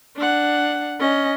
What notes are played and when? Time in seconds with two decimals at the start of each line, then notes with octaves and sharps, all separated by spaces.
0.16 D4 F#5
1.00 C#4 D#5